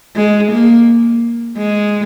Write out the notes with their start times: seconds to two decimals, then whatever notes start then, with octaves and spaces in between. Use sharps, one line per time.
0.16 G#3
0.52 A#3
1.57 G#3